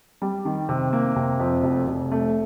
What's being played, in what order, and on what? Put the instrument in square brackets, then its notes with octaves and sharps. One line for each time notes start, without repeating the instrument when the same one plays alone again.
[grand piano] G3
D#3
C3
A#3
C3
F2
F1
F1
A3